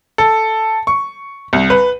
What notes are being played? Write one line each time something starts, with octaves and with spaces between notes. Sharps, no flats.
A4
C#6
C2
B4